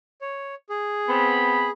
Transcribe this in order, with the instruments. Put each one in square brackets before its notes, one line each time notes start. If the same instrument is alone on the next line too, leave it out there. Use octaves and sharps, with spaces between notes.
[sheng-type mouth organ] C#5
G#4
[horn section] B3 C4 B5